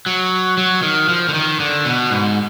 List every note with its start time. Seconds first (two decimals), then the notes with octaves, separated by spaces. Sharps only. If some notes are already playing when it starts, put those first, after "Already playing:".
0.06 F#3
0.58 F#3
0.83 D#3
1.09 F3
1.28 D3
1.34 D#3
1.60 D3
1.85 B2
2.10 G#2